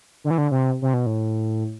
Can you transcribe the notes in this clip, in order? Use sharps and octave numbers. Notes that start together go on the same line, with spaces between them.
D3
E3
D3
C3
C3
B2
A2